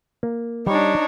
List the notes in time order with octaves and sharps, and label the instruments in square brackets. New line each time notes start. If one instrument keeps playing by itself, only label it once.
[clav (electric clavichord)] A#3
[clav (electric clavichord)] G3 [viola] D4 C#5 [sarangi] D#4